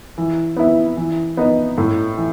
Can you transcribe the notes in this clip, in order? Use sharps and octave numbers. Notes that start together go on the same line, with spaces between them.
E3
B3 E4
E3
B3 D#4
A2
E3